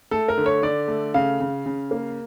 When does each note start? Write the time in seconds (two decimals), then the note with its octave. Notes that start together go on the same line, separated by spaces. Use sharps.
0.11 A3 A4
0.28 A#4
0.38 D3
0.46 C#5
0.63 D3 D5
0.88 A3
1.14 C#3 F5
1.40 C#3
1.66 C#3
1.91 A#3